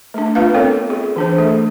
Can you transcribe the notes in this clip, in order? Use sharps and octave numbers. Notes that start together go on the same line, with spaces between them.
A3 D4
B3 F4 B4 F5
C4 A4 A#4 C#5
G#4
E3 D4 C5
A3 A4